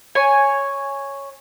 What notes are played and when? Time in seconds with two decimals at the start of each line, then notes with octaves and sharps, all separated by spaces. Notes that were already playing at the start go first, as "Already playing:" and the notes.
0.15 C#5 G#5